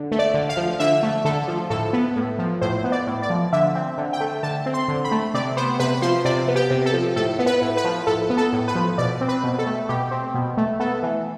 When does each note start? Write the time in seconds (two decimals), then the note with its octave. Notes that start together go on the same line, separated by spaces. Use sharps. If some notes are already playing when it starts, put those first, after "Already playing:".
Already playing: D3
0.12 A3
0.19 D5
0.34 D3
0.49 F5
0.57 F3
0.80 D3 E5
1.03 A3
1.25 D3 A4
1.48 F3
1.70 A2 A4
1.93 B3
2.16 A2
2.39 F3
2.61 A2 C5
2.84 B3
2.92 D5
3.07 A2
3.22 D5
3.30 F3
3.53 D3 E5
3.75 C4
3.98 D3
4.13 G5
4.20 A3
4.43 D3 A5
4.66 C4
4.74 C6
4.88 D3
5.04 B5
5.12 A3
5.34 C3 D5
5.57 B3 C5
5.80 C3 B4
6.02 F3 C5
6.25 C3 D5
6.48 B3
6.56 G4
6.71 C3
6.86 A4
6.93 F3
7.16 A2 A4
7.39 B3
7.46 B4
7.62 A2
7.77 B4
7.84 F3
8.07 A2 A4
8.30 B3
8.37 A4
8.53 A2
8.68 B4
8.75 F3
8.98 B2 D5
9.21 C4
9.29 B4
9.44 B2
9.59 A4
9.67 A3
9.89 B2 G4
10.11 C4
10.34 B2
10.57 A3
10.80 B3 A4
11.03 E3